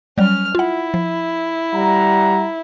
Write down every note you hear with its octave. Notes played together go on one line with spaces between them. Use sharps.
F#3 G3 C#4 F6
E4 F4 F#5
F3
G3 F#5 A#5